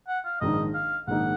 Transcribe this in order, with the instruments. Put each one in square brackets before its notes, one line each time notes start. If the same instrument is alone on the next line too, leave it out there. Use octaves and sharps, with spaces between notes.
[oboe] F#5
F5
[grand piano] A#1 G#2 D#3 A#3 D#4 [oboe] D#5
[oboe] F5
[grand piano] A#1 G#2 D#3 A#3 D#4 [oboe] F#5